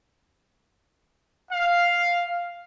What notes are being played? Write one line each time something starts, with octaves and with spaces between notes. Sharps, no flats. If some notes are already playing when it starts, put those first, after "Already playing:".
F5